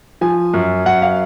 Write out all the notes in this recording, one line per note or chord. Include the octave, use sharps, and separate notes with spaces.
F3 G#5
F#2
F#2 F#5
F5